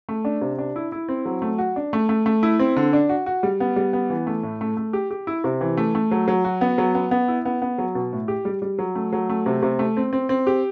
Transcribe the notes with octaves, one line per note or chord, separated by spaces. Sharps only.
A3
D4
C3
D4
E4
E4
C4
F#3
A3
F#4
D4
A3
A3
A3
E4
C4
D3
D4
F#4
F#4
G3
B3
G3
B3
E3
A3
A2
A3
A3
G4
G4
E4
C3
E3
A3
A3
F#3
F#3
F#4
B3
F#3
B3
B3
E4
B3
B3
F#3
B2
A2
G4
G3
G3
F#3
A3
F#3
A3
C3
C3
A3
C4
C4
C4
G4